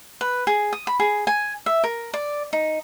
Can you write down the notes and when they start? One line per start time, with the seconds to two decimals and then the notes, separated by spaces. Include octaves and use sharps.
0.21 B4
0.47 G#4
0.73 D#6
0.87 B5
1.00 G#4
1.27 G#5
1.66 E5
1.84 A#4
2.14 D5
2.53 D#4